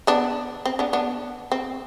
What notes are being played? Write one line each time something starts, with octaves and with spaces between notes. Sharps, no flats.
B3 D4
C4
B3 D4
B3 D4
C4